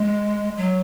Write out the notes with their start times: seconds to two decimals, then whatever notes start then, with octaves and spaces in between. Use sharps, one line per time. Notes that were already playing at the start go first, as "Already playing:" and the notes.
Already playing: G#3
0.57 F#3